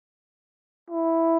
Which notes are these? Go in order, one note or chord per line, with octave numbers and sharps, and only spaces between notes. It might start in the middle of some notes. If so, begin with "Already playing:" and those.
E4